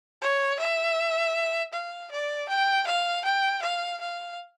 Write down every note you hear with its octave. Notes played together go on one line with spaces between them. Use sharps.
C#5
E5
F5
D5
G5
F5
G5
F5
F5